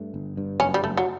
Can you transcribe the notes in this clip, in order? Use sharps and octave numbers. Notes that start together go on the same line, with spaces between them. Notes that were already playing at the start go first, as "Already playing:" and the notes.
Already playing: G2 A3
G1
G2
F#1 C#4
G3
F#1 A3
F#3